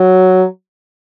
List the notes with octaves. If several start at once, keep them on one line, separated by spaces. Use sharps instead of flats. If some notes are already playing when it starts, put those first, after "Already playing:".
Already playing: F#3